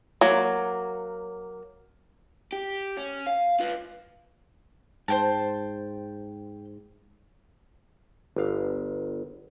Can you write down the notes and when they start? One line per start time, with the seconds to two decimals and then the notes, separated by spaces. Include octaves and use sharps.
0.21 F#3 A#3
2.52 G4
2.97 C#4
3.27 F5
3.60 F4 B4
5.08 G#2 C5 G5 A5
8.36 G1 F5